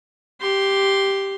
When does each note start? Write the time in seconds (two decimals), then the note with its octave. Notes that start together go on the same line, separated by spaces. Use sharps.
0.41 G4 C6